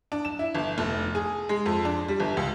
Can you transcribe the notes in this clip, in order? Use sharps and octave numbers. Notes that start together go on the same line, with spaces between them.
D4
E7
E4
G1
F1
G#4
G#3
F2
D4
G3
G1
C#2